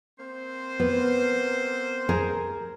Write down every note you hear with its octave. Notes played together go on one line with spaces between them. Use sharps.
A#3 C4 C5
B3
G#4 A#4